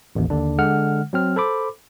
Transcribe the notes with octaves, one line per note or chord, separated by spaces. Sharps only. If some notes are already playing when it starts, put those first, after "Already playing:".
A1 D#2
D#2 D3 D4
D3 G#3 F#5 F6
F#3 C4 F6
A4 C5 B5 D6